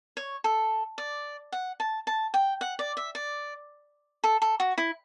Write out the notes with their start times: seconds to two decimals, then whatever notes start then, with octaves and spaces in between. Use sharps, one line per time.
0.17 C#5
0.44 A4
0.98 D5
1.52 F#5
1.80 A5
2.07 A5
2.34 G5
2.61 F#5
2.79 D5
2.97 E5
3.15 D5
4.24 A4
4.42 A4
4.60 F#4
4.78 E4